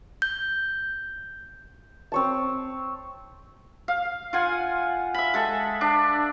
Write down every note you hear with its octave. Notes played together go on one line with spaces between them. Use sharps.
G6
C4 C#5 A5
F5
F4 F#5 G#5
E5 B5
G#3 A4 E5
D4